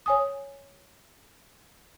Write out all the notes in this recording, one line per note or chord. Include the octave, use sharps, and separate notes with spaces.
C#5 G#5 D#6